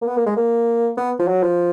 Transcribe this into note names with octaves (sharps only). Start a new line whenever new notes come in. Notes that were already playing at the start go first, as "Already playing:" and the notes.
A#3
B3
A#3
G#3
A#3
B3
F3
F#3
F3